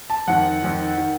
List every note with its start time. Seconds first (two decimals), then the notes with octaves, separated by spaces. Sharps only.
0.10 A5
0.27 F2 D#3 F#5
0.63 F2 D#3
0.98 D#3